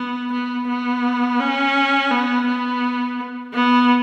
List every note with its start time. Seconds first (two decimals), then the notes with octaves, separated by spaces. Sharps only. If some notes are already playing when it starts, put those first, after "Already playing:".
Already playing: B3
0.33 B3
0.68 B3
1.40 C#4
2.11 B3
2.47 B3
3.54 B3